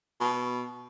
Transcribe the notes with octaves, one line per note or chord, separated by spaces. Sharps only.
B2